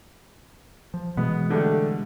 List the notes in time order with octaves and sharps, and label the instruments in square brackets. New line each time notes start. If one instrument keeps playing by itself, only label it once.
[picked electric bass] F3
[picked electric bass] B2 E3 G#3 [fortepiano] B3
[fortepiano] D3 G3 A3